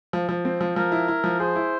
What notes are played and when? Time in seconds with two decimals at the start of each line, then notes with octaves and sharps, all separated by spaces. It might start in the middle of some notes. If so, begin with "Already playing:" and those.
0.13 F3
0.29 F3
0.45 C4
0.61 F3
0.76 F3 A#4
0.92 E4
1.08 E4
1.24 F3
1.39 G#4 C5
1.56 E4